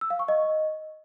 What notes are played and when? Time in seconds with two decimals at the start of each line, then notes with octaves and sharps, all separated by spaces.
0.01 E6
0.10 F5
0.19 C#6
0.28 D#5